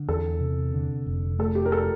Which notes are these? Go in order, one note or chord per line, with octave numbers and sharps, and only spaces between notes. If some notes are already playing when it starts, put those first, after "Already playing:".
Already playing: D3
E2 A4
C3
D3
F1
A3 A4
G4
A#4
A4